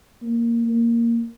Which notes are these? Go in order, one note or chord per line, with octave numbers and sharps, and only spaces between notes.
A#3
A#3